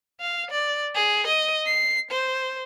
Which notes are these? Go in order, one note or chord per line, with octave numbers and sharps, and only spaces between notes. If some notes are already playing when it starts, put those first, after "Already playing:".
F5
D5
G#4
D#5
C7
C5